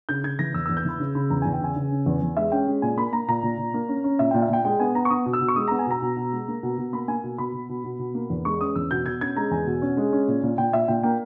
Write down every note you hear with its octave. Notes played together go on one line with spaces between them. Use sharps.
C#3 G6
C#3 G#6
E3 A#6
E2 E6
E2 E6
G6
E3 B5
C#3
C#3 B5
E2 A#5
E2 G#5
G5
C#3 G#5
C#3
C#4
E2
E2
G#3 E5
C#4 G5
G#3
A#2 G#5
A#3 B5
A#3 A#5
A#2 A#5
A#2
A#2
A#3
C#4
C#4
A#2 E5
A#2 G5
E5
A#2 G5
G#3 G5
B3 G#5
B3 A#5
C#6
B3 D#6
B2
E6
B2
C#6
G#3 D#6
B3 A#5
G#5
B2 A#5
B2
B2
G#3
A#3
B2
B2
A#3 B5
A#3 G#5
B2
B2 B5
B2
B2
B2
B2
A#3
E2
G#3 C#6
C#4 D#6
E2 E6
B2 G6
B2 G#6
C#4 G#6
G#3 A#5
E2 G#5
B2
C#4
G#3
C#4
A#2
A#2
A#2 G5
A#2 E5
A#2 G5
A#3 G5